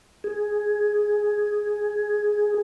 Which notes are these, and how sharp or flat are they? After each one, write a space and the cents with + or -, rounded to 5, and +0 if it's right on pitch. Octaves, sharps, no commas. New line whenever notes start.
G#4 +5